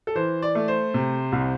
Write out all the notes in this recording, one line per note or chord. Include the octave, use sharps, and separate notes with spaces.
A4
E3 C5
D5
A3
C5
C3
C2